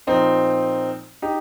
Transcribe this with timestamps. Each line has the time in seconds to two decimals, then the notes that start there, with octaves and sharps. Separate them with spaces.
0.07 A#2 F3 C4 D#4
1.22 D#4 G4